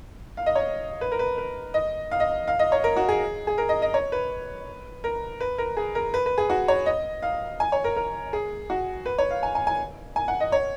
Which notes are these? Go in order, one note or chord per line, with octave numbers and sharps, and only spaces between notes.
F5
D#5
C#5
B4
A#4
B4
B4
D#5
F5
D#5
F5
D#5
C#5
A#4
F#4
G#4
G#4
A#4
D#5
D#5
C#5
B4
A#4
B4
A#4
G#4
A#4
B4
B4
G#4
F#4
C#5
D#5
F5
G#5
C#5
A#4
A#4
G#4
F#4
B4
C#5
F5
G#5
G#5
G#5
G#5
F#5
D#5
C#5